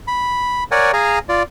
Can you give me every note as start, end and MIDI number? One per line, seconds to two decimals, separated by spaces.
0.07 0.64 83
0.71 0.91 70
0.71 0.91 73
0.71 0.91 74
0.71 0.91 78
0.71 0.91 80
0.93 1.19 68
0.93 1.19 77
0.93 1.19 80
0.93 1.19 82
1.29 1.43 65
1.29 1.43 74